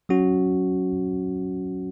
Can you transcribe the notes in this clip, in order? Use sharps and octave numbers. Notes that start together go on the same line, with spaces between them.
F#3 C#4 F#4